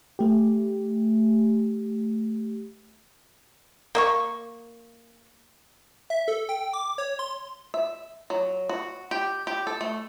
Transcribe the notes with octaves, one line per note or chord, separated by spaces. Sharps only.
A3 G4
A#3 E5 C#6
E5
A4
G5
D6
C#5
C6
E5
F#3
F#4
G4
G4
A4
A3